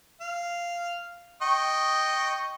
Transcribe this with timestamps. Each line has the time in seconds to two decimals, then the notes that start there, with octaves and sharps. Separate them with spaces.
0.21 F5
1.42 D#5 G5 C#6